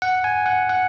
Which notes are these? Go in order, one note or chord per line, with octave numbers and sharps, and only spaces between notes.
F#5
G#5
F#5
F#5